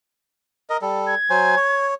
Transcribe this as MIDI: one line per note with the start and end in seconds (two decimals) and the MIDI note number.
0.70 0.77 70
0.70 0.77 75
0.82 1.15 55
0.82 1.15 69
1.07 1.87 92
1.30 1.55 54
1.30 1.55 72
1.30 1.55 80
1.56 1.94 73